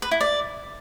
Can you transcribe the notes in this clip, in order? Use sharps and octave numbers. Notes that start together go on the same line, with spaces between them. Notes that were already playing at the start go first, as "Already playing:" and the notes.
B4
E4
D5